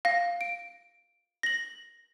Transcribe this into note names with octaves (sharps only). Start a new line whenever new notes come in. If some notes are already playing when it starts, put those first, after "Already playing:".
F5 A#6
D7
A#6 F#7